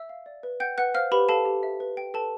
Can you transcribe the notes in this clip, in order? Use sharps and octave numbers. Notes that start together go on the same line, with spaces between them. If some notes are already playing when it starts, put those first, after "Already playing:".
Already playing: E5 E6
F5
D5
B4
F#5 G5 G6
B4 F#5 F#6
C5 F5 F6
G4 B4 B5
A4 F5 A5
G4
E5
B4
G5
A4 B4 A5